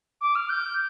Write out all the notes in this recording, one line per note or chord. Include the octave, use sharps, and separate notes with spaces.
D6
F6
G6